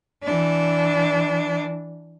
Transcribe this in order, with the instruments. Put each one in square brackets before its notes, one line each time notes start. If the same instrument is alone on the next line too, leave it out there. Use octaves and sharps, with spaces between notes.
[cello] E3 D4